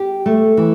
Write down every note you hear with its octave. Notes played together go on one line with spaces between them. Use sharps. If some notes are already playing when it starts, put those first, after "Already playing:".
Already playing: G4
A3
E3